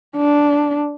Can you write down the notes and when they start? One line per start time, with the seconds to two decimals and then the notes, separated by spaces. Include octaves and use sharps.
0.16 D4